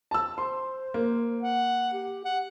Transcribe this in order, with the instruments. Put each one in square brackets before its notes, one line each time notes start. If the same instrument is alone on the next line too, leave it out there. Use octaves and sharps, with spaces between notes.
[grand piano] A5 E6
[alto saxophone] C5 [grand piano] C6
[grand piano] A#3
[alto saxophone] F#5
G4
F#5